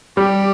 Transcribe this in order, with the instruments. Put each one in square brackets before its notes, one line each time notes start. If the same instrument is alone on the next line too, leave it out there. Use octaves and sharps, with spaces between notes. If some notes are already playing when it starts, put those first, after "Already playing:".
[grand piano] G3 [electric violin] G4